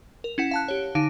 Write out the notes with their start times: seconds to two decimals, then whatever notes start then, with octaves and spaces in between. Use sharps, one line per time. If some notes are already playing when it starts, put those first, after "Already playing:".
0.24 A#4
0.38 C#4 E4 F#5
0.51 F5 A5 F#6
0.68 G4 C#5
0.95 D3 D#4 F5 D7